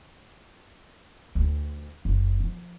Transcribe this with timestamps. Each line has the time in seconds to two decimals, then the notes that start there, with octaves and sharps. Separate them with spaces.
1.35 D2
2.05 F#1
2.40 F3